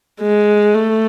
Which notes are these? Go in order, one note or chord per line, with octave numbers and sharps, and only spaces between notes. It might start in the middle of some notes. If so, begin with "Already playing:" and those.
G#3
A3